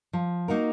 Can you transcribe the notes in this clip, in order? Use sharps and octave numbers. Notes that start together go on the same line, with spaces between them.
F3
A#3 D#4 F#4 A#4